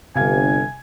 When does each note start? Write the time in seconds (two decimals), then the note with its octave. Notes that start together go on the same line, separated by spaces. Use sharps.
0.15 G1 C3 F5 G#5 G#6